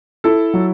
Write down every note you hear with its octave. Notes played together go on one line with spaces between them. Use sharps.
E4 A4
F#3